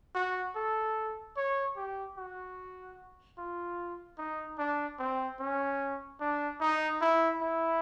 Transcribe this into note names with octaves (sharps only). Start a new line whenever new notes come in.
F#4
A4
C#5
G4
F#4
F4
D#4
D4
C4
C#4
D4
D#4
E4
E4